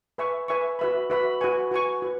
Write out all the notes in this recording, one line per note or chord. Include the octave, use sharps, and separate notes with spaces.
B4 E5 G#5 C#6
B4 E5 G#5 C#6
F#4 B4 E5 B5
F#4 B4 E5 B5
F#4 B4 G#5 C#6
F#4 B4 G#5 C#6
F#4 B4